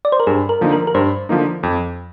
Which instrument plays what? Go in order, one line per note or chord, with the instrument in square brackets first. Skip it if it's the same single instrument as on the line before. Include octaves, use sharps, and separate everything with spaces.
[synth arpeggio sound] D5
C5
A#4
[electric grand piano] G2 [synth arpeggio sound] G#4
[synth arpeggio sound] A#4
[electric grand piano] D3 F3 A#3 D#4
[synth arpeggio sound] A#4
A#4
[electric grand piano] G2 [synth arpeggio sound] C5
[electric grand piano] D3 F3 A#3 D#4
F2